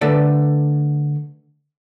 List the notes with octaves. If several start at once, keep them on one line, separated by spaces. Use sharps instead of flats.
D3 A3 A4 B4 D5